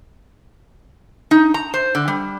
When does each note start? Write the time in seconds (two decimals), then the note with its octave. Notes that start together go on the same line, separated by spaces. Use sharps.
1.31 D#4
1.54 A#5
1.74 C5
1.95 D3
2.08 G3